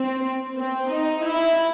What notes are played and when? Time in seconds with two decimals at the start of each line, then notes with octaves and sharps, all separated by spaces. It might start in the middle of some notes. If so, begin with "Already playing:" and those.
Already playing: C4
0.57 C4
0.90 D#4
1.25 E4